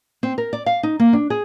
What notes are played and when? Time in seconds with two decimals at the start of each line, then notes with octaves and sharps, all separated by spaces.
0.23 C4
0.38 A#4
0.53 D5
0.66 F5
0.83 D#4
1.00 A#3
1.13 D4
1.30 G#4